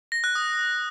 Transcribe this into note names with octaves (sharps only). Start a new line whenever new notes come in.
A#6
F#6
D#6